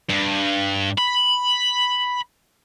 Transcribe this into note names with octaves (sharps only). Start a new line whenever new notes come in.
G2
B5